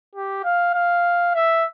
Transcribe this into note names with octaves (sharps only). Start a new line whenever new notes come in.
G4
F5
F5
E5